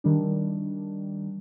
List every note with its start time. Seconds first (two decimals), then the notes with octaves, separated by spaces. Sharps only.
0.04 D#3 G3 D4